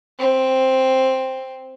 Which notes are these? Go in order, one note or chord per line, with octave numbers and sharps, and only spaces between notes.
C4